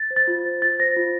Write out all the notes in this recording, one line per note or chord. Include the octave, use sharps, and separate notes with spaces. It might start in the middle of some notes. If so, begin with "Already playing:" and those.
Already playing: A6
C5
A6
F4
C5
F4 A6
C5 A#6
F4